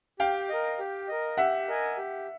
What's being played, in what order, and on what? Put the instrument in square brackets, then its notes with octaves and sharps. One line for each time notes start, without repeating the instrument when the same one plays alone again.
[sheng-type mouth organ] G4 [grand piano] F5 G5
[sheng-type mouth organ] A#4 D#5
G4
A#4 D#5
[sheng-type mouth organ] G4 [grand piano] E5 F#5
[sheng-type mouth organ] A#4 D#5 G#5
G4